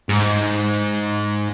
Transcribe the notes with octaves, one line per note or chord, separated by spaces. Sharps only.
G#2